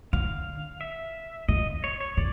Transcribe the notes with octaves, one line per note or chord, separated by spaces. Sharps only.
D3 F5
E5
C#3 D#5
C#5
C#5
C3 D5